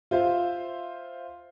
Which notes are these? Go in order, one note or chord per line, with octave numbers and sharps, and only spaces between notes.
F4 C5 E5 F5